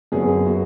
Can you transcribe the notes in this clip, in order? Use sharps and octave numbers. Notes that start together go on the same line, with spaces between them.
F#2 F#3 B3 G#4
F#4